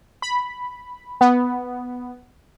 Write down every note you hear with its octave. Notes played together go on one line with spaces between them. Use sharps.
B5
B3